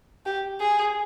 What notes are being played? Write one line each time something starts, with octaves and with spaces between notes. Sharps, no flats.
G4
G#4